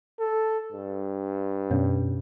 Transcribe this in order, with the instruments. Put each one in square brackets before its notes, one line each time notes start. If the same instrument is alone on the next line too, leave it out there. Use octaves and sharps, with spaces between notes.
[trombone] A4
G2
[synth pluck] F#2 B2 C#4